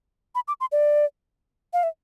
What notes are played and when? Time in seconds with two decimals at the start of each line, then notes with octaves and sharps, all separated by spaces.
0.35 B5
0.48 D6
0.61 C6
0.72 D5
1.73 F5
1.83 E5